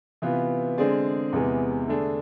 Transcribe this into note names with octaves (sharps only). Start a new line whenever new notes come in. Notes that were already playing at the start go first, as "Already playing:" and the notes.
C3 E3 B3 F4 B4
D3 G#3 C4 G#4 D5
E2 C3 E3 G#3 B3
D3 A3 D4 G#4